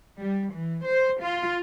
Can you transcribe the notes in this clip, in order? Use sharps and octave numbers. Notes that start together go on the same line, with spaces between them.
G3
E3
C5
F4